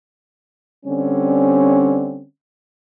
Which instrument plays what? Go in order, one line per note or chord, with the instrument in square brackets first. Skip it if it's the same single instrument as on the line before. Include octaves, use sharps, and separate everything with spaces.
[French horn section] D3 G3 C4 C#4